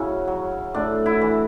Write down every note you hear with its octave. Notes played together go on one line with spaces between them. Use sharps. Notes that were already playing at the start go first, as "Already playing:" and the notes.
Already playing: C#3 F#3 C#4 E4 F#4
F#3
A2 D4
E4
E3